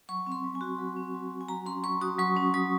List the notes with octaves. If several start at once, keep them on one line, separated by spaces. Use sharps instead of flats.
F#3 C#6
C4
C6
F#3
G#5
F#4
F#3
C4
F#3
F#4
G#5
F#3 A#5
C#4 C6
F#3 C#6
F#4 D#6
F#3 C#6
C#4
F#3 D#6